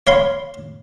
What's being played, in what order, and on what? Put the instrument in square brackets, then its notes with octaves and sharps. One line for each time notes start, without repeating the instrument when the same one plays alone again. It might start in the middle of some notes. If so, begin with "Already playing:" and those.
[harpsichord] C#5 F5 B5 C6